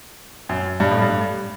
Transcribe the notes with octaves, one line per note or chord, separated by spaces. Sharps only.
F#2
G2
A2
G2